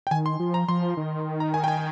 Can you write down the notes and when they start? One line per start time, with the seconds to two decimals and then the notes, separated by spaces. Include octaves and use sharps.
0.07 G5
0.11 D#3 G#5
0.26 C6
0.40 F3
0.54 A#5
0.68 F3 C6
0.97 D#3
1.40 A#5
1.54 G#5
1.64 G5
1.68 G#5